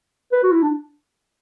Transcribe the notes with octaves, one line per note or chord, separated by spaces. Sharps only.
B4
F#4
E4
D4